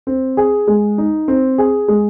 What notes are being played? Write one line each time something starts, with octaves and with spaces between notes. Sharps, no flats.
C4
G#4
G#3
D#4
C4
G#4
G#3